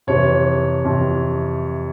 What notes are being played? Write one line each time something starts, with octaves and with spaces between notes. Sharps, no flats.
F2 C3 E3 C#5
F2 C3 E3